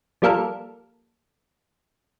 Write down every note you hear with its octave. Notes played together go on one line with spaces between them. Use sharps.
F3 G3 A#3 A4 A#4